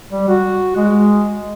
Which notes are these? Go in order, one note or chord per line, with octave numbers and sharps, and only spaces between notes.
G3
F#4
G#3